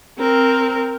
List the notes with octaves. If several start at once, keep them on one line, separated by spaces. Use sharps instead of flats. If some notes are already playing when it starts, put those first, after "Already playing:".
C4 A#4